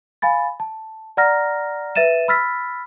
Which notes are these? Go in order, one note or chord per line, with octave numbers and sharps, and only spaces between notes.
F5 G#5 B5 A6
A5
D5 F#5 A#5 F6 A#6
B4 E5 A6 D#7 E7
B5 E6 F6 A6 B6